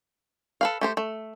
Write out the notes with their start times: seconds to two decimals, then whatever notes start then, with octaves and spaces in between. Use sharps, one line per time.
0.61 A4 B4 F5
0.81 A3 G4 C5
0.97 A3